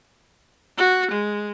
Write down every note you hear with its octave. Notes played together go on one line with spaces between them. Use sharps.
F#4
G#3